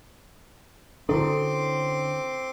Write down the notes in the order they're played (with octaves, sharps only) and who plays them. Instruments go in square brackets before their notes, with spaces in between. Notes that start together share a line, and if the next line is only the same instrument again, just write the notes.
[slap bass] D3 C#4 [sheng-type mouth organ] C4 C6 D6 [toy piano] E4 F#4 A4